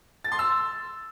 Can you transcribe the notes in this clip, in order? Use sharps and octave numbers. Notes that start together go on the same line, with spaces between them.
A6
C6
E6